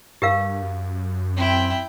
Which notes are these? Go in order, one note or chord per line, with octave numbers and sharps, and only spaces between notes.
G2 G4 A#4 F5
F#2
C4 E4 G5